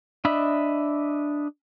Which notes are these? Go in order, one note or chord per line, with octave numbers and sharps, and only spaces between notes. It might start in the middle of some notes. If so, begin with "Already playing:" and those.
D4 D#5 E5 B5